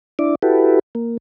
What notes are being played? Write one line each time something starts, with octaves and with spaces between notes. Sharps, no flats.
D4 E4 D5
E4 F#4 G4 A4 B4
A#3